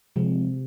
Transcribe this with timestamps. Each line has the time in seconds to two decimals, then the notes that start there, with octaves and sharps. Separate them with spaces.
0.16 C3 F3 G#3